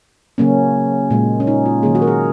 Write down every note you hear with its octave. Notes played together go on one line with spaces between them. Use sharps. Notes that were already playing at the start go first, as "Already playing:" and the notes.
C#3 F#3 A#3 C#4
A#2 G#3
C#4
D#4
F4
D#3 F#3 A#3 G#4
F#4
A#4
G#4